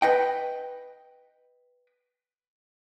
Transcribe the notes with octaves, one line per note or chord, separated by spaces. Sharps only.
B4 D#5 G5